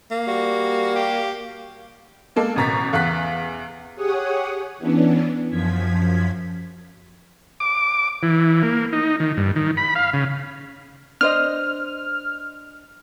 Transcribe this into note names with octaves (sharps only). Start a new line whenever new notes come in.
A#3
G3 F#4
G4
G#3 A#3 A4
A1 B2 A#5 A6 B6
E2 F5 F#6 B6
G4 G#4 C#5 F#5 D#6
E3 B3 C#4 D4
F#2 F3 G#6 B6
D6
E3
A#3
D#4
D#3
G2
D#3
B5
F5
C#3
D4 C5 D#5 F6